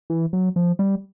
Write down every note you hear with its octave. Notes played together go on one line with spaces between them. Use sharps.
E3
F#3
F3
G3